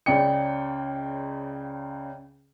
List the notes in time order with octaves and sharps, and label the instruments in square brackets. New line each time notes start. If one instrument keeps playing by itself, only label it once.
[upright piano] C#2 C#3 D5 G5 C#7